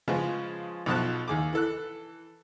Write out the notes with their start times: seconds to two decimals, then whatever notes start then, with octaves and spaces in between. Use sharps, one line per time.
0.08 C#3 F3 G#3 F4 G#4 B4
0.86 B1 B2 F3 A5 F#6
1.28 D#2 G#4 D6
1.53 E3 A4 F#6